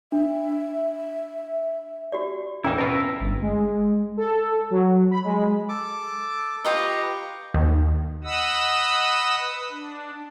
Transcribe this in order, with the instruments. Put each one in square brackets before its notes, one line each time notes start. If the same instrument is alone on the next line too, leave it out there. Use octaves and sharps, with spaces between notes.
[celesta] D4 [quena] E5
[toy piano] F#4 G4 D5
[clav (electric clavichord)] A1 D#2 D#4 [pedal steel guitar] E3 E4 [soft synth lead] C#4 [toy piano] G5 A#5
[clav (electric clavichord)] F2 B2 F4 [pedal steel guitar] A#4 E5 [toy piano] B4
[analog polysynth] G1
G#3
A4
F#3
B5
G#3
[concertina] A4 D6
[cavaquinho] F4 G4 D#5 [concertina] B4 A#5 C#6
[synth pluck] D#2
[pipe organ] D#5 F#5 B5 D#6 E6
B4
D4